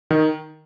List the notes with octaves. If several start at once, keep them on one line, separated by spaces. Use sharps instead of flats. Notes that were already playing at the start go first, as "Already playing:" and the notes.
D#3